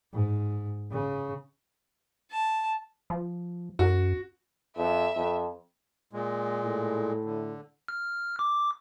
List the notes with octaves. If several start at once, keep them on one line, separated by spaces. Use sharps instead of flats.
G#2
C#3
A5
F3
F#2 F#4
F2 E5
F2
A#2 G#3
A2
D3
F6
D6